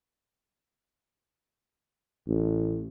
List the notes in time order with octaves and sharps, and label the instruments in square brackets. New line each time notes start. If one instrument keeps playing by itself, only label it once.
[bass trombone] A1